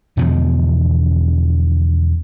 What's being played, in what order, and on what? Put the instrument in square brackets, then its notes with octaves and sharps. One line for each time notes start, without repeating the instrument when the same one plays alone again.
[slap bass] E2 B2 D3 F3